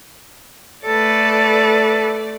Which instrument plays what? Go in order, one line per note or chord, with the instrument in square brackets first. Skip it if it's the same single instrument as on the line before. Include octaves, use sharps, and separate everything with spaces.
[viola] A3 D5 [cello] A4 B4